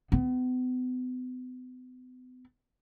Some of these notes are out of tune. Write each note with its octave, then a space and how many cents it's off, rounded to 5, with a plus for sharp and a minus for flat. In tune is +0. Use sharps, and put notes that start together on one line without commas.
B3 +40